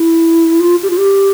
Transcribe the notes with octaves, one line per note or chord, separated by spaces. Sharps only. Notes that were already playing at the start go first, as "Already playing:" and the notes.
Already playing: E4
F4
G4
F4
G4